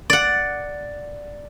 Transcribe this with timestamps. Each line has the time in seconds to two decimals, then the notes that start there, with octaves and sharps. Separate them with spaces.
0.10 D5 F#5